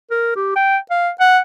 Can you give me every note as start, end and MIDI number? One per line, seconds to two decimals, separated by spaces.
0.11 0.32 70
0.36 0.54 67
0.56 0.77 79
0.90 1.10 77
1.20 1.39 78